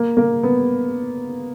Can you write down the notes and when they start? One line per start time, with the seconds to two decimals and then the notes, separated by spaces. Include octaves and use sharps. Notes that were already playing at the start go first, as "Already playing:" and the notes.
Already playing: A#3
0.17 A#3
0.43 B3